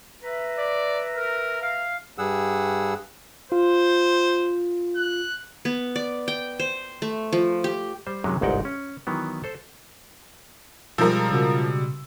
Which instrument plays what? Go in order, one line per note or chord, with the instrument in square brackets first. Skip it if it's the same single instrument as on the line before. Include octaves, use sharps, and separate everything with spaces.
[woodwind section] B4 E5 A#5
[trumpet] D5
A#4
F5
[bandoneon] G2 G3 G#4 F#5 E6
[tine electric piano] F4 [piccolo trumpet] C5
[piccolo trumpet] F#6
[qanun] B3
D5
G5
C5
A3
F3
G4
[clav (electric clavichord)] G3 C5
F#2 C3 D#3 F#3 G#3
G1 C2 G#2 D#4 F#5 G5
C#4
D#3 E3 F#3 B3
A4 C5
[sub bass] B2 [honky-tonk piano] F3 A#4 [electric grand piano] G3 G#3 E6
[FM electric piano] C#3 F#4